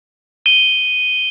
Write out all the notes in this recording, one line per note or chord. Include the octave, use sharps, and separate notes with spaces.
D#7 G7